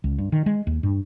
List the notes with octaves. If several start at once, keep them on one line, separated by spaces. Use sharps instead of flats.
C#2
G2
D#3
G#3
D#2
G2